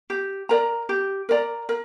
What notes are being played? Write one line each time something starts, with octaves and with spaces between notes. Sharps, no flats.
G4
A#4 D5 A#5
G4
A#4 D5 A#5
A#4